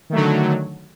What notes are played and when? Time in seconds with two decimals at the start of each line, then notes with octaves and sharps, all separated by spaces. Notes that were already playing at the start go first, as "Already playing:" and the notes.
0.10 D#3
0.12 A3
0.15 F#3
0.18 D3